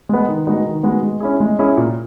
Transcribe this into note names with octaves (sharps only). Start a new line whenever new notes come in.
G#3 B3
D#3
G#3 B3 D#4 F#4
D#3
G#3 B3 D#4 F#4
G#3
C#4 E4 G#4
G#3
C#4 E4 G#4
A#2